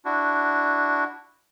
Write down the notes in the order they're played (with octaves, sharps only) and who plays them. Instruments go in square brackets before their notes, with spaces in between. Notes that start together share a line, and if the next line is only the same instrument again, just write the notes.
[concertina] D4 E4 F#4